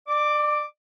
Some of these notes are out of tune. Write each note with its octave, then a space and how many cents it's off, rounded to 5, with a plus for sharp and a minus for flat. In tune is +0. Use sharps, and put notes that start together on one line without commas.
D5 +35 D6 +0